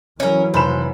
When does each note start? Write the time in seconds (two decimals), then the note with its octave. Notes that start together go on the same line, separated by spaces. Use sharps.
0.20 E3 F#3 C#4 A#4
0.54 F1 C5 B5 E7